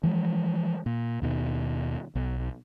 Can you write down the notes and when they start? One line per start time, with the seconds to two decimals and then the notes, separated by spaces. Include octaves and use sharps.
0.04 E3 F3 G#3
0.86 A#2
1.22 D#2 B2 D#3
2.15 B1